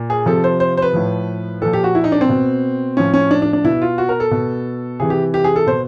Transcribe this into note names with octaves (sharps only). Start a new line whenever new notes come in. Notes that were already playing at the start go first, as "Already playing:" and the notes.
Already playing: A#2
G#4
C3 F3 A4
C5
C5
C5
B4
A2 F3
A#2 F3 A4
G4
F#4
E4
D#4
D4
C4
B2
A2 F3 C#4
C#4
D4
D4
D4
B2 E4
F4
F#4
A#4
A4
B2
C3 E3 G#4
G4
G4
G#4
A4
B2 C5